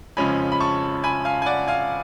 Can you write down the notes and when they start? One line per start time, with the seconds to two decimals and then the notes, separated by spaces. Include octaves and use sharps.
0.17 F2 C#3 F3 G#3 C#4 G#5 B5
0.52 B5
0.60 A5 C#6
1.04 G#5 B5
1.25 F5 G#5
1.42 G#5
1.46 D5 F#5
1.68 F5 G#5